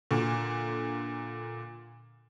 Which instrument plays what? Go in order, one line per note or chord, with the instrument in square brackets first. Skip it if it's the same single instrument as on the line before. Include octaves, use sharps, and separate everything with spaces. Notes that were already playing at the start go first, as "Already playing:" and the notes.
[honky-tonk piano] A#2 D3